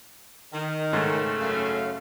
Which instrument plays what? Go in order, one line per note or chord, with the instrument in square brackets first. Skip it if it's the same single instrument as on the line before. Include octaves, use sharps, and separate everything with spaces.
[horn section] D#3
[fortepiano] G#2 [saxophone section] C#3 A3 C#4
[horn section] F#2 F5